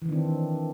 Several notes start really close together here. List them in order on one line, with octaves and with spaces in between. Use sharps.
E3 D#3 D4 C4